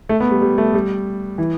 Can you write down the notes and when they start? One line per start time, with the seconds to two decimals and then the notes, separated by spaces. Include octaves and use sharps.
0.09 A3
0.20 B3
0.31 G3
0.42 G3
0.58 A3
0.74 G3
1.38 E3